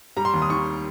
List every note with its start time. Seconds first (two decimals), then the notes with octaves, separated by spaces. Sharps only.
0.17 G3 A#5
0.25 C6
0.34 D#2
0.42 D#6
0.50 D#3 C#6